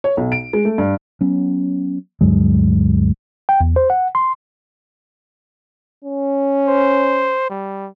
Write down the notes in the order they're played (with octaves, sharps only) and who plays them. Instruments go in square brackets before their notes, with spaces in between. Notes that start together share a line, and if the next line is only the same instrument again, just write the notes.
[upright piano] C#5
B1
D7
G#3
A3
G2
[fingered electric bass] F#3 B3 C#4
D2 G2 F#3 G#3
[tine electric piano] G5
E2
C5
F#5
C6
[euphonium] C#4
[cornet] C5
G3